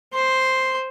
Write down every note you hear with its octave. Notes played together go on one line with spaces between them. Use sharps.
C5 C6